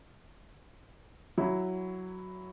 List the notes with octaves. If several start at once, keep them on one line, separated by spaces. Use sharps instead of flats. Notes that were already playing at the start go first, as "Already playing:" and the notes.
F#3 E4